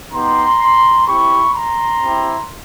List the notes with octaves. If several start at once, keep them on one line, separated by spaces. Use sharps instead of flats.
B3 D#4 G4 A#5 C6
C4 E4 G4 B5 C#6
A#5 C6
C4 E4 G4